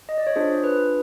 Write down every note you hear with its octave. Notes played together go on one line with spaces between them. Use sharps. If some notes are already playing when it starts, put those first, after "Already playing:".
D#5
D5
C#5
D4 F4 G#4 C5
B4